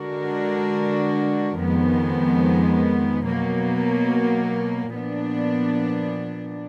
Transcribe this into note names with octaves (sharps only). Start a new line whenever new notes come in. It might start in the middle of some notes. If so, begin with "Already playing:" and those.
Already playing: D3 G#3 D4 F#4 A#4
F2 D#3 G#3 B3
B2 F#3 A#3
A#2 F3 B3 D4